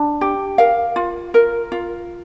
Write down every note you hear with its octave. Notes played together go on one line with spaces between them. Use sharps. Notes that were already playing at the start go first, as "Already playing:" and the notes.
Already playing: D4
G4
A#4 F5
F4
A#4
F4